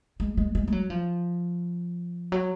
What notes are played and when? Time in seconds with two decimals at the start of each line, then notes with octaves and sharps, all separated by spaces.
0.20 G#3
0.37 G#3
0.55 G#3
0.68 G#3
0.72 F#3
0.90 F3
2.32 F#3